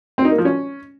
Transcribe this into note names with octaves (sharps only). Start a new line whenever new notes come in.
C4
D#4
A#3
F3
C#4